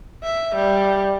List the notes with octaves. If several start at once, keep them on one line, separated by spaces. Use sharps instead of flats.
E5
G3